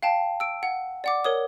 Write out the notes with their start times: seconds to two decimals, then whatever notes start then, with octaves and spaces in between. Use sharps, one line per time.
0.03 F5 G5 A5
0.40 E6 D7
0.63 F#5
1.04 D5 F#5 D6
1.25 A#4 C#5 D#6